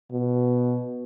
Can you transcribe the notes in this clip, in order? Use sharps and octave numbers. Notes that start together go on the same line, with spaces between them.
B2